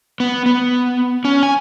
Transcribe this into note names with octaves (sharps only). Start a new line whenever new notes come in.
B3
B3
C#4
G#5